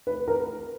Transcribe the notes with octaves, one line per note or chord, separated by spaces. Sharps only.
B4
A#4